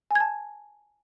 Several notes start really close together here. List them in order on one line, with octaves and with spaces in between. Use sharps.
G#5 G#6 A5